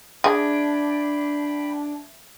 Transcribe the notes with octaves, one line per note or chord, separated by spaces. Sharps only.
D4 G#4 E5 G5 B5 G#6